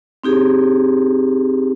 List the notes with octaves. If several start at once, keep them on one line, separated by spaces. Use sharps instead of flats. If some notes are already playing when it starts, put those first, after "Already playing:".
C4 D#4 G4 G#4